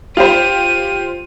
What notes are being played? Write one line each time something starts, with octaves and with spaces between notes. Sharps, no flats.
F4 G4 C5 D#7